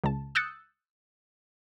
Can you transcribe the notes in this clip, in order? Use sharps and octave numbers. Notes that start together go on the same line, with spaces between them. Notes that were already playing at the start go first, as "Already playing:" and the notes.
C#2 A5
D#6 E6 F#6 G6 A6 C#7